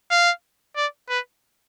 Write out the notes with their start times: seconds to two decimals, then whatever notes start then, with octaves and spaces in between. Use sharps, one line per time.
0.11 F5
0.76 D5
1.09 B4